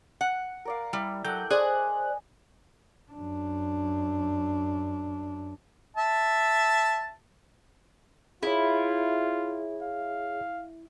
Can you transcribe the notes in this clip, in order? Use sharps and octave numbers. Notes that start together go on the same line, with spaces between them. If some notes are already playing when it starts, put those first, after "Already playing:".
F#5
A#4 D5 F5
G3 E4
F#3 A4 G5 F#6 G6
G#4 C5 D5 D#5 G#5 F#6
F#2 D4
E5 A5
E4 F4 G#4 C#5
F5